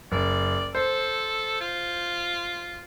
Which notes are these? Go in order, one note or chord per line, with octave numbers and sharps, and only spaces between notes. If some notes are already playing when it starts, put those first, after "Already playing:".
F#1 D5
A4 C5
F4